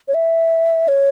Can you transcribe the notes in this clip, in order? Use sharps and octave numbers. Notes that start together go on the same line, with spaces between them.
C#5
E5
C#5